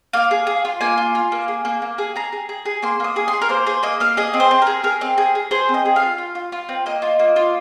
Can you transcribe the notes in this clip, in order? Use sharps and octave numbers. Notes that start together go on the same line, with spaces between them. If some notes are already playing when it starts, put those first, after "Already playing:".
A#3 F5
G#4
G#4
F4
A#3 G#5
F4
F4
A#3
G#4
A#3
A#3
G#4
G#4 A#5
G#4
G#4
G#4
A#3 C6
A#3 D#6
G#4
C6
G#4
A#4
A#3 C5
G#4 C5
A#3 D#5
A#3 F5
G#4 D#5
C4
C5
C4
G#4 A#4
G#4 A#4
C4
G#4
G#4
G#4 C5
C4
D#5
G#4
F5
F4
F4
F4
F4
C4
A#3 D#5
F4
A#3
F4